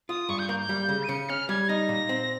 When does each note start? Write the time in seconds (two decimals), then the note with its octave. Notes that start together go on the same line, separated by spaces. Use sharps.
0.09 F4 D#6
0.29 G2 C#6
0.39 G6
0.49 A#3 G6
0.59 G6
0.69 G3
0.89 C#3
1.03 D#7
1.09 C#3 C#7
1.29 C#4 F6
1.49 G3 G#6
1.69 D#4 A#6
1.89 A#2
2.09 C4